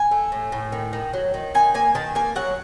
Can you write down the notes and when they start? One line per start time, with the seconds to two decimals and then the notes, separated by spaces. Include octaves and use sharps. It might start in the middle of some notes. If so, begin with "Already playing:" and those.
Already playing: G#5
0.11 A3
0.32 A2
0.52 A2
0.72 D#3
0.93 D#3
1.13 F#3
1.34 D#3
1.54 D#3 G#5
1.74 A#3 G#5
1.95 D#3 A5
2.15 A#3 G#5
2.35 F#3 F#5